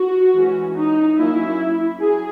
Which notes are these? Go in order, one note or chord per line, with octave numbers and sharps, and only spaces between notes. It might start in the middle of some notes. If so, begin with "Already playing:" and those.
Already playing: F#4
E3 G#3 C#4
D#4
F#3 A#3 C#4 E4
F#3 G#4